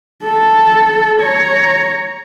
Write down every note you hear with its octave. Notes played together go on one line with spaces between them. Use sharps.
A4
C#5 A#5